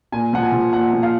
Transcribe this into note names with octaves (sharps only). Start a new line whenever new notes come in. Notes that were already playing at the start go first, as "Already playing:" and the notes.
A#2 G#5
F3 F#5
G#5
F3
A#2 F#5
F3
F5